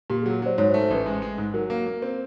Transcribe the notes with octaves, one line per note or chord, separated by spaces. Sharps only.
A#2 G4
F#3 G#4
F#3 C5 D5
G#2 C#5
C5
A3
C5
A1 B4
G#3
G#3
G#2
F#3 A#4
A#3
A#3
C4